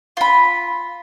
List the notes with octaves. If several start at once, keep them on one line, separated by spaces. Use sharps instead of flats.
F4 B5